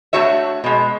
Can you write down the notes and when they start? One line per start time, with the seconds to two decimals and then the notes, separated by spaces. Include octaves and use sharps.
0.13 A3 B3 D4 F#4 C#5 E5
0.64 B2 G#3